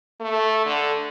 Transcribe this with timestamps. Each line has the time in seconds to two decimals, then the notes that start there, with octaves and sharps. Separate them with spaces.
0.21 A3
0.66 D3